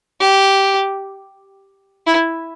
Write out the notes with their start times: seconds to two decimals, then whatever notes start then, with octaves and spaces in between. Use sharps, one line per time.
0.21 G4
2.06 E4